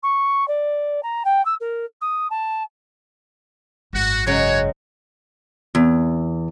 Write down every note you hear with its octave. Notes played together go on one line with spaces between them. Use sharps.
C#6
D5
A#5
G5
E6
A#4
D#6
A5
G#1 F#2 F#4
C#3 F#3 G#3 F#4 C#5
E2